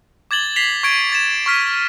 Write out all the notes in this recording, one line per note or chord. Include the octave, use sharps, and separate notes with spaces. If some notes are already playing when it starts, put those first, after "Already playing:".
D6 G#6 A6 F#7 G7
B6 C7 F7 G7
C#6 G#6 D7
C#6 A6 E7
C#6 F6 B6